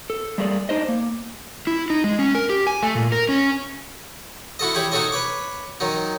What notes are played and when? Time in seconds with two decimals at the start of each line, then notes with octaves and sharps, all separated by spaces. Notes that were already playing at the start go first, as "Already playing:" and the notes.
0.10 A4
0.38 G3 A3 A#3 G#4 D5
0.69 D4 D#4 C5 D#5
0.89 A#3
1.67 E4
1.90 D#4
2.04 G#3
2.19 C#4
2.35 A#4
2.50 G4
2.67 G#5
2.83 A3
2.95 A#2
3.12 A#4
3.29 C#4
4.59 E4 F#4 A4 D#5
4.75 E4 G4 G#4 C#5
4.92 D#4 F#4 G#4 A4 C#5 D#5
5.12 B4 C#5 D6
5.80 D#3 F#3 D#4